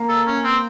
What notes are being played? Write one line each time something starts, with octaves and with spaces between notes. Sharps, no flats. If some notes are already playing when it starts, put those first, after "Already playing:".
Already playing: A#3
A4
C#4
C4